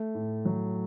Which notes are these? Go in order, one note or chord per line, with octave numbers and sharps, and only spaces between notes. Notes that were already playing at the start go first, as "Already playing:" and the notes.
Already playing: A3
A2
F#3